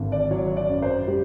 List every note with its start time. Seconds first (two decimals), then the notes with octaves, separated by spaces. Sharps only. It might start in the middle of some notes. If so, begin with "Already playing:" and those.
Already playing: G#1 D3
0.12 D5
0.31 F#3 C#5
0.57 D5
0.69 F#2
0.82 C5
1.08 G3 G4